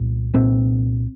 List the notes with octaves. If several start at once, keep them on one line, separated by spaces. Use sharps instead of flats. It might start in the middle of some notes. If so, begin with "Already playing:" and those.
Already playing: C2 A#2
C2 A#2 C4